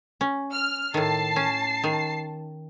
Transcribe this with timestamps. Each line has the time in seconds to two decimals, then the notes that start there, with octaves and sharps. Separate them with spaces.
0.21 C#4
0.53 F6
0.94 A2 D#3 A5 C7
1.36 C#4
1.84 D#3